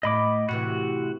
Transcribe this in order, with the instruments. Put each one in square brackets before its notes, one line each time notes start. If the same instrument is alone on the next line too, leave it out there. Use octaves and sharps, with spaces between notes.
[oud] A2 [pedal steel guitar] D#5 B5 D6
[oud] A2 C3 E3 [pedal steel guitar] F#4